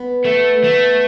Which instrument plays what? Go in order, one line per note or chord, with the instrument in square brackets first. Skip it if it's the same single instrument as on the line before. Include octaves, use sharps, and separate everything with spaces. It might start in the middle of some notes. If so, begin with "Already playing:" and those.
Already playing: [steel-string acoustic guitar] B3
[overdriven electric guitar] A3
A3